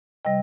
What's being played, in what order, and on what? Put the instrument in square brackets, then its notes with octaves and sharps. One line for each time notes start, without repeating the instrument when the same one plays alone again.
[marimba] C3 G3 D#5 G5